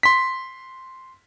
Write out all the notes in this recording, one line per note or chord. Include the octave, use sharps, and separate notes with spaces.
C6 B6